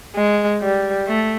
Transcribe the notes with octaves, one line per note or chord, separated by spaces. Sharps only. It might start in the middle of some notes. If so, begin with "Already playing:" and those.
G#3
G3
A3